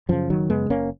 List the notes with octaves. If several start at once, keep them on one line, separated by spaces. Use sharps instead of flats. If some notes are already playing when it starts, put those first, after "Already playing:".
F#2 C#3 F3
F#1 D#3 F#3
F#2 C#3 G#3 B3
F#1 A#3 C#4